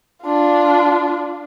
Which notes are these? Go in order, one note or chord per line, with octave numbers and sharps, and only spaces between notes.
D4 F4